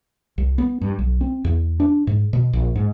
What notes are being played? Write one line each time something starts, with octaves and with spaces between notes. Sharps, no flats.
C2
B3
G2
B1
C4
E2
D4
G#2
B2
A#1
G#2